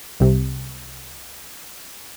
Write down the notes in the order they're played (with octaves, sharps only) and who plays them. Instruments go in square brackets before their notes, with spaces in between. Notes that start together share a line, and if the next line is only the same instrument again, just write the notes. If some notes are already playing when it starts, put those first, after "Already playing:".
[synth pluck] C2 C3